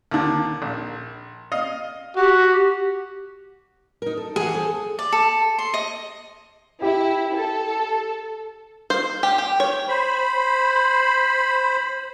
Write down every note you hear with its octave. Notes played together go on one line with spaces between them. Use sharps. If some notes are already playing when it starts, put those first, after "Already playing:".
D#2 D3
A#1
D#5 F5
F#4 G4
D#4 A#4
A4
E3 G#4 A#4 F#5
A4 C5
D5
A4
C6
D#5
E4 G4
A4
C5
G4
G4
C#5
C5 B5